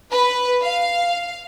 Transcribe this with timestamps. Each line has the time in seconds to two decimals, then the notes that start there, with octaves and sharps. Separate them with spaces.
0.12 B4
0.62 F5